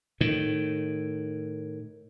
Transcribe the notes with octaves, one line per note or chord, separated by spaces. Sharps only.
A2 D#3